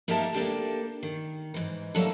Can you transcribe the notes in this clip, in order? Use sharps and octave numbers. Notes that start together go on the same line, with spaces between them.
A#3 D#4 G4 A#4 E5 A5
A#3 D4 G4 A4
D#3
G#2 E3
F#3 G3 A#3 D4 E4 A4